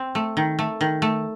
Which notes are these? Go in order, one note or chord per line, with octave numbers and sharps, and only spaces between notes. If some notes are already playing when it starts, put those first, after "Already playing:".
Already playing: C4
A3
D#3
A3
D#3
A3